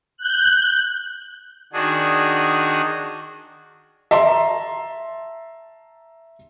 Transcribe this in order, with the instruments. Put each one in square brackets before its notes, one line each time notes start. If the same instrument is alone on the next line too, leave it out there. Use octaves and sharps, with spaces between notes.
[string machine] F#6 G6
[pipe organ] D#3 D4 F#4 G#4
[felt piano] E5 A5 A#5 C6